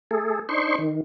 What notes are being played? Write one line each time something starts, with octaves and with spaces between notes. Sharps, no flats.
A3 G#4 A4
D4 D#4 C5 C6 C#6
D#3